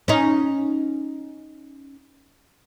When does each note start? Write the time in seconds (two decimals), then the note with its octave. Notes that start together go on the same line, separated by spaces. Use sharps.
0.08 C#4 D#4